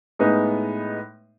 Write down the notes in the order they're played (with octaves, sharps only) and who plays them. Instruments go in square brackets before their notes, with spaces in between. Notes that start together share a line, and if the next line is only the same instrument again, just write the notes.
[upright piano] A2 G#3 B3 D#4